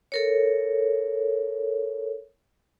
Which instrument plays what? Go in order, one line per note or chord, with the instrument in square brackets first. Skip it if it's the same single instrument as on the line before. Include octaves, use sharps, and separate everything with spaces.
[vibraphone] A4 A#4 C#5